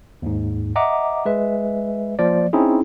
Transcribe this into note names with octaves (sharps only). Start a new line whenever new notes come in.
D#2 G#2
D#5 E5 F#5 A#5 D6
G#3 B4 E5
F3 A#3 D5
C4 C#4 D#4 E4 G#4